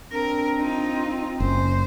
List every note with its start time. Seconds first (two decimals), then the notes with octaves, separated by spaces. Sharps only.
0.12 C4 D4 A#4
0.60 D#4 F4
1.40 F#1 C#4 C5